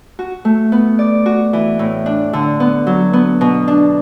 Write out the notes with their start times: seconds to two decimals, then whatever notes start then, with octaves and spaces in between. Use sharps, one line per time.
0.19 F#4
0.45 A3
0.72 B3
0.99 D5
1.26 F#4
1.53 E3
1.79 A2
2.06 D4
2.33 D3
2.60 B3
2.87 F#3
3.13 B3
3.41 B2
3.68 D4